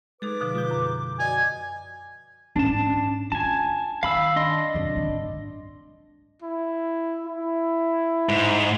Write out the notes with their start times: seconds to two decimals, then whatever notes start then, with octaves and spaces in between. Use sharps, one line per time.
0.22 G#3 D#4 G#4 A4 B4 D6
0.41 B2 D3 F3
0.55 F4 G6
0.71 F#2
1.19 F#4 D5 D#5 G#5
2.56 G#2 C#4 D4 A5
3.32 F4 G#5 A5
4.03 D#3 F5 B5 E6
4.36 D4 D#5 C6
4.74 F#2 C3
4.96 G#1 D3
6.42 E4
7.27 E4
8.29 G#2